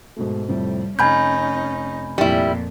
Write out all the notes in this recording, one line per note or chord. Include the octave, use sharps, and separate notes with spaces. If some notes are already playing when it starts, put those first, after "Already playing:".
G#2 B2 A3
F2 A2 C3 G3
F1 C#4 D#4 G#5 B5 F6 G6 G#6
F2 A#2 G3 E4